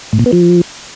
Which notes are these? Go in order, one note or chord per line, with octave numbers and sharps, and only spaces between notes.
A2
A#2
B3
F3